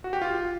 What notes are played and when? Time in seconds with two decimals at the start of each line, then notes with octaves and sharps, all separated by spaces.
0.04 F#4
0.13 G4
0.22 F4